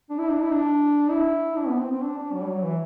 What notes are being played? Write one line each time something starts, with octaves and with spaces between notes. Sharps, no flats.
D4
E4
D4
E4
D4
E4
D4
B3
C4
C4
D4
D4
F#3
G3
F#3
E3